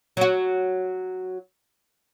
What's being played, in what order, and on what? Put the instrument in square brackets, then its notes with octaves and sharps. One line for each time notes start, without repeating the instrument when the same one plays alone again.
[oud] F#3 F#4